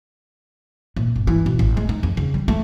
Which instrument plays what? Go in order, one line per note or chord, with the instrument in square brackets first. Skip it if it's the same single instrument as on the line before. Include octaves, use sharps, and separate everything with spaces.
[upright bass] A#2
G1
E3
B2
A1
G#3
D#4
F2
C#3
G3
A3